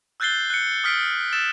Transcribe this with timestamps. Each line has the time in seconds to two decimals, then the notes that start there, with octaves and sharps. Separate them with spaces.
0.20 E6 F#6 G6 A6 C7 G7
0.50 F#6 C#7
0.84 D#6 F6 B6 C7 D7
1.33 E6 A6 E7